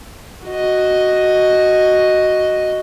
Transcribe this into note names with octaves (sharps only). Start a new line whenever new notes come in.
F#4 D#5